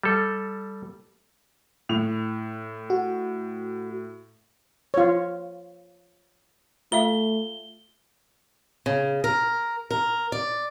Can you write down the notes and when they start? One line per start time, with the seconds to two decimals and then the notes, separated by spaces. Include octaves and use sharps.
0.03 G3 A4
1.89 A2 F7
2.90 F#4
4.94 F4 C#5
6.92 A3 F4 E5 F5 G7
8.86 C#3
9.24 A#4
9.91 A#4
10.32 D5